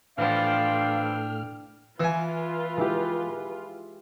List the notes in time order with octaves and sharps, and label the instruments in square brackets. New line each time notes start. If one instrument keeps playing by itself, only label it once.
[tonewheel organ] A2 F6 [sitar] E3 F3 B3 [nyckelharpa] D4 G5 [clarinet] F5
[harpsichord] E3 G#5 [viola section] F4 [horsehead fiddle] B4
[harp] G#3 E4 G4